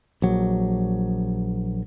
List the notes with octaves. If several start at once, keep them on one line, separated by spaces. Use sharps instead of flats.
A#1 F#3